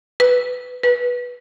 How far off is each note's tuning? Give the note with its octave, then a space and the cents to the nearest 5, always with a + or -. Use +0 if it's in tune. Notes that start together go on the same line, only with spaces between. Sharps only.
B4 +15
B4 -10